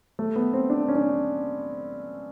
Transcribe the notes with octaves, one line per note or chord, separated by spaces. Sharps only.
A3
B3
C4
D4
C#4
D4